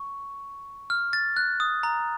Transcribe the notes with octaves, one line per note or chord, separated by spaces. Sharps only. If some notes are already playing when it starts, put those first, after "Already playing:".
Already playing: C#6
F6
A6
F#6
D#6
A#5